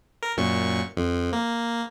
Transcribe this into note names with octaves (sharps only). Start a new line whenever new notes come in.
A#4
F#2 A#2 C#6
F2
A#3